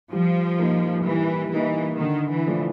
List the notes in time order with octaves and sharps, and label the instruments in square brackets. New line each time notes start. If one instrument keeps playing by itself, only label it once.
[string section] F3 [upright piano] G3
[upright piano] A#3 D#4
[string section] E3 [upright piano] G3
[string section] E3 [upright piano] A#3 D#4
[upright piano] D3 [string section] D#3
[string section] E3
[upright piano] F3 A3 D4